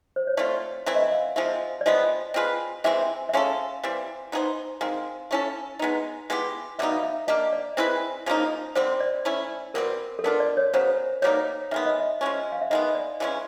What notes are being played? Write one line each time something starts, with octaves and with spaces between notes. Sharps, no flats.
C5
C#5
A3 C4 F4 D5
E3 A3 C4 E4 E5
D#5
E5
F5
F3 G#3 C4 E5
D5
C3 F3 G#3 B3 D#5
C4 F4 G#4 B4
C3 E3 G#3 C4 E5
E5
G#3 C#4 F#4 A4 F5
E3 G3 C4
B3 D#4 G#4 C5
D#3 G#3 C4 F5
A3 C#4 E4 A4
G#3 B3 D#4
G#3 B3 E4 G4
B2 G3 B3 D#4 E5
F5
E5
A#3 D4 G4 D#5
D5
C4 E4 G#4 B4
C#3 F3 A#3 D#4
D3 G3 C4 C5
D5
A3 C#4 E4
B2 G3 C4 A#4
A4
B3 D4 F4 A#4
D5
C#5
C#3 F#3 B3 C5
B2 G3 A#3 D#4 C#5
D#3 G#3 B3 E5
D#5
E5
F3 G#3 C#4
F5
E5
D#3 G#3 B3 D#5
D5
C#3 E3 G#3 C#4